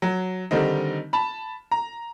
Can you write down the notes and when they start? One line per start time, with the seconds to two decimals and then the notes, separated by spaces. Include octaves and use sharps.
0.02 F#3
0.51 D3 D#3 G3 C4 D#4
1.13 A5 B5
1.71 A#5